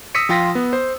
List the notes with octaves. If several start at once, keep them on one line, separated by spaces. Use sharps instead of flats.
D#6 E6 A#6 B6 C#7 D#7
F3 F4 G5 C6 A#6 B6
B3
C5